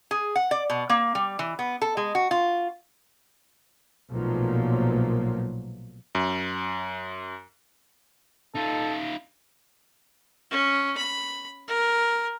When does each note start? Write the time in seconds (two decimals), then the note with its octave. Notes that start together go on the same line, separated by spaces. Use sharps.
0.11 G#4
0.36 F#5
0.51 D5
0.70 B2
0.90 A#3
1.15 G3
1.39 E3
1.59 B3
1.82 A4
1.97 G#3
2.15 F#4
2.31 F4
4.10 B1 A#2 F3 F#3 A3 A#3
6.15 F#2
8.55 D#4 F4 A4
10.51 C#4
10.97 B5
11.68 A#4